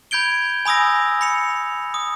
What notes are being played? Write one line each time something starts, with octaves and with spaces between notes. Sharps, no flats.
B5 G6 G#6 D7 G7
G#5 B5 D#6 E6 A#6
B5 C#7 F7
D#6